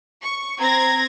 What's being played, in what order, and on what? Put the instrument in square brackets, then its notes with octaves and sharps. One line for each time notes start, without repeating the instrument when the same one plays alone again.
[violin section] C#6
[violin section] C4 G#6 A#6 [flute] A#5